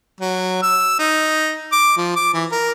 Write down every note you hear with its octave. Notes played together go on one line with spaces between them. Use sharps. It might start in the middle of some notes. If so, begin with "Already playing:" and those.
F#3
E6
D#4
D6
F3
D6
E3
A#4